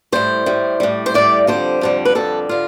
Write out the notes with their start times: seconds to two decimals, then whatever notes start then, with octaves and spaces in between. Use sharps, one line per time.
0.12 A2 G3 C5
0.46 A2 G3
0.80 A2 G3
1.06 C5
1.14 A2 G3 D5
1.47 F2 D3 G3 C5
1.81 F2 D3 G3
2.05 B4
2.15 F2 D3 G3 A4
2.49 D3 F4